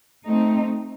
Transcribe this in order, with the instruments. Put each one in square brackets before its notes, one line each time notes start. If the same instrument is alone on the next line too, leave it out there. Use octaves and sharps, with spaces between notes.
[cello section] A3 C4 D#4